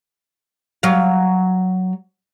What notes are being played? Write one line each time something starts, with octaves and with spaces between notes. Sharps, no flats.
F#3 F5